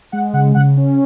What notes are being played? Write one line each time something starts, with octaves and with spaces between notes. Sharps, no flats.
G#3 F#5
C#3 F#5
C#3 F#5
C#4